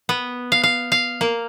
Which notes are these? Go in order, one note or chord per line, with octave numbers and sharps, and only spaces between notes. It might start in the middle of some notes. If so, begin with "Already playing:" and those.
B3
F5
F5
F5
A#3